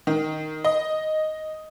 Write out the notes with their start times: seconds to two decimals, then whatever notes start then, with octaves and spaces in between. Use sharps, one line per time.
0.07 D#3
0.64 D#5